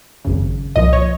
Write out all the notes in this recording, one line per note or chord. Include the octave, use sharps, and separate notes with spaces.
G#1 F#2 C#3
C2 A#2 F3 D#5
C#5